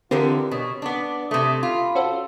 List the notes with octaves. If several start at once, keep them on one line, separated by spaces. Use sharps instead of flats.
D3 E3 B3 C4 F4 G4 A#4
B2 C#5
B3 D4 D5
C3 A3 D#6
F4 B5
C#4 F#4 A4 C5